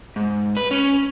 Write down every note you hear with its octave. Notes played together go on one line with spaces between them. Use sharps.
G#2
B4
C#4